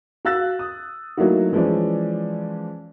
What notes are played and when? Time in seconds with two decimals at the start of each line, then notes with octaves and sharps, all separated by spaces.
0.25 F#4 F5 E6 F#6 A6
0.59 D#6
1.17 F#3 A3 A#3 D#4 E4 F#4
1.53 E3 F3 G#3 C#4 D5